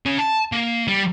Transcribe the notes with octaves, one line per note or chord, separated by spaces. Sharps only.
C#4 G#4
A5
A#3
G3